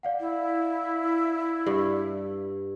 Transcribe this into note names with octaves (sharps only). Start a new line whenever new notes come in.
D5 F5 F#5
E4
G2